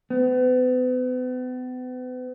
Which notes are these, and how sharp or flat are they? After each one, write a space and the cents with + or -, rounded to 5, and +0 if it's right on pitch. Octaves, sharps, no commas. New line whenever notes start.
B3 +40